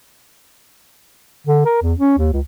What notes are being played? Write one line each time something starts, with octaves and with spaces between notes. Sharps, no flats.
D3
A#4
E2
C#4
D#2
C#2